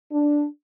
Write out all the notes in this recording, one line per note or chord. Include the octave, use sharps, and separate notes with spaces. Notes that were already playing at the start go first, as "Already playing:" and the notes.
D4